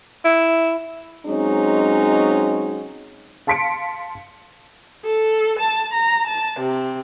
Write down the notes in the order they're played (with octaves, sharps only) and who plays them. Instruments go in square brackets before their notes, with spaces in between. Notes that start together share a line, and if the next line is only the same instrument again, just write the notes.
[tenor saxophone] E4
[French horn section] F#3 G#3 C4 C#4 D#4
[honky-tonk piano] F5 A5 C6 B6 C#7 D7
[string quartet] A4
A5
A#5
A5
C3